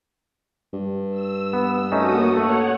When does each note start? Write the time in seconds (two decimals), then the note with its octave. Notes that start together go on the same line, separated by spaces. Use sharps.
0.73 G2
1.11 E6
1.53 B3
1.92 A3 A#3 C#4 D#4 F#4 D#6
2.33 A3 A4 C#5 F#5